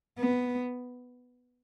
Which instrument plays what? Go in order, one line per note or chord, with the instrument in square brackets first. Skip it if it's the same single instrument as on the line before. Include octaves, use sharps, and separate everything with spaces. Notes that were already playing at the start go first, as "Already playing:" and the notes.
[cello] B3